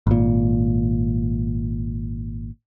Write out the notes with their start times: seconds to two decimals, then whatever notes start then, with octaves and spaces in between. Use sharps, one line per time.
0.07 G#1 A#2